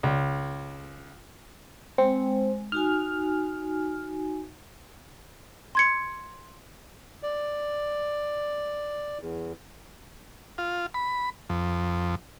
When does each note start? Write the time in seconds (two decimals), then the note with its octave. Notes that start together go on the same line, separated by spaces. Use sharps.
0.03 C#2
1.98 G#3 C4
2.72 D#4 F#4 G#5 F6
5.75 C6 G#6 C#7
7.23 D5
9.21 E2
10.58 F4
10.94 B5
11.50 F2